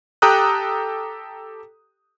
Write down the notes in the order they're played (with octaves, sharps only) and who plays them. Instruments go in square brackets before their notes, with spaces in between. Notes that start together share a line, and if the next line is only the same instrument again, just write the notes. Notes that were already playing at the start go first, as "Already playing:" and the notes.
[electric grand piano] G4 A4 G5 A#5 D#6 F#6